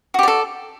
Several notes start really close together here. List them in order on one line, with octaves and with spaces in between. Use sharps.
F#4 G4 D5 A4